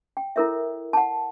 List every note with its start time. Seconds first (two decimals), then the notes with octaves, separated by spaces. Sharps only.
0.17 G5
0.36 E4 A4 A#4 C#5 E5
0.93 F#5 A5